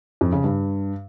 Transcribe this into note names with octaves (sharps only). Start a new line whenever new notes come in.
F2
C#3
G2